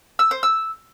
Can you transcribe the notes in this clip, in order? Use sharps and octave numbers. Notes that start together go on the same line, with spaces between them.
E6
C5
E6